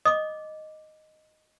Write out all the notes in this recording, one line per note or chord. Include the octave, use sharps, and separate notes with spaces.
D#5 D6 D#6